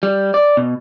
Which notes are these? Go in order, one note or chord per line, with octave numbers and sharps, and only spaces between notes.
G3
D5
B2